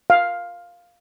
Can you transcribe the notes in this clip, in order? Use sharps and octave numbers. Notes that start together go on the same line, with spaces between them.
F5